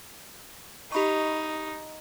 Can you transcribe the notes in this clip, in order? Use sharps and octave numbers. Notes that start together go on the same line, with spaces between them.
D#4 G4 B5 C#6